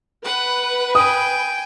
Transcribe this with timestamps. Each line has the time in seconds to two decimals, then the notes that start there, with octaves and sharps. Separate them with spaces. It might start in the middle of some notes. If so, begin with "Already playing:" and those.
0.24 B4 F#5
0.95 G5 G#5 D#6